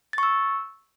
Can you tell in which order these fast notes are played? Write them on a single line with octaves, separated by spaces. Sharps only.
A6 C#6 E6